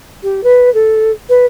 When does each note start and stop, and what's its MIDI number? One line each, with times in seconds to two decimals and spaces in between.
0.23 0.41 67
0.43 0.72 71
0.74 1.11 69
1.29 1.46 71